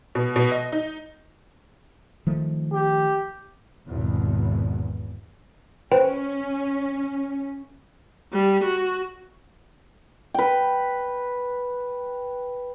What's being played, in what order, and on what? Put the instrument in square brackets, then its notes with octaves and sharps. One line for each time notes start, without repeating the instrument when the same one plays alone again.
[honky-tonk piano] B2
B2
D#5
D#4
[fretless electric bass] D#3 F3 A3
[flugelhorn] G4
[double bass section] G#1 E2 B2
[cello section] C#4 [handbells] B4 C5 G5
[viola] G3
F#4
[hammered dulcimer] B4 G5